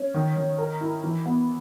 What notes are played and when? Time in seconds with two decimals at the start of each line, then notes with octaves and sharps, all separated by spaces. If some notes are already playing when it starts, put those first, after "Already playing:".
Already playing: C#4
0.14 D#3
0.36 D#3
0.58 A#4
0.81 E4
1.03 E3
1.26 B3